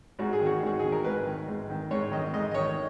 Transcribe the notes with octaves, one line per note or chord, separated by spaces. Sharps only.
G#2 F#4
G#4
D#3 F#4
G#2 F#4
D#3 G#4
A#4
G#2 B4
D#3
G#2
D#3
G#2 C#5
D#3 D#5
G#2 D#5
D#5
D#3 C#5